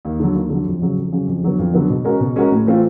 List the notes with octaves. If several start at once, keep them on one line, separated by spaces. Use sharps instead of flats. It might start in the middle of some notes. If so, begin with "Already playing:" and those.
D#2
D3 F#3
D#2
D3 F#3
F2
C#3 F#3
F2
C#3 F#3
F2
D3 F#3 B3
F2
D3 F#3 B3
B2
G#3 C#4 F#4 A#4
B2
G#3 C#4 F#4 A#4
A2
E3 A3 C4 F4